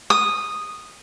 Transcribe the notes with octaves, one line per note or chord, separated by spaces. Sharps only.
D#6